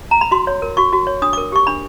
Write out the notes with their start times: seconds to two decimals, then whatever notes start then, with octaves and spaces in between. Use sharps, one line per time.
0.11 A#5
0.21 B5
0.31 F#4 C6
0.47 C#5
0.62 A#4
0.77 F#4 C#6
0.93 F#4
1.07 C#5
1.22 D4 D#6
1.33 D6
1.38 A#4
1.52 G4 C#6
1.67 D4 B5